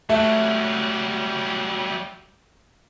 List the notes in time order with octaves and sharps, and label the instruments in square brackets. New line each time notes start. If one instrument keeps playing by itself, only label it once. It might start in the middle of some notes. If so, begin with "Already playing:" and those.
[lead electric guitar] F#3 G3 [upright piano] A3